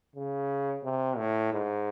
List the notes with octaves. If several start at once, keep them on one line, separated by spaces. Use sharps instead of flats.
C#3
C3
A2
G#2